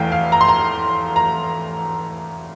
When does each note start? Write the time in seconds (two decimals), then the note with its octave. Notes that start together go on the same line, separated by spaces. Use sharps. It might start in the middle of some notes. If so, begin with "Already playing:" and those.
Already playing: F1 E2 E3 A3 F5 G5
0.12 F5
0.32 A#5
0.41 C6
0.49 A#5
1.16 A#5